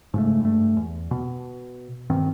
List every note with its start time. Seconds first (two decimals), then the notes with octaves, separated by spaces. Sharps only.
0.14 G#2 C#3 A3
0.41 G2 A3
0.77 E2
1.11 B2
2.10 G2 D#3 C4